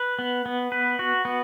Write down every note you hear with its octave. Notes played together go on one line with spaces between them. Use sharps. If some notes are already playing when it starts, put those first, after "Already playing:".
Already playing: B4
B3
B3
B4
F#4
B3